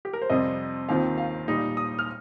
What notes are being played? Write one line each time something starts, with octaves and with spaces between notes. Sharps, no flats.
G4
A#4
C5
F2 C3 G3 C4 D#5
D#2 D#3 C4 F4 F5
F5
A#2 G3 D#4
D#6
F6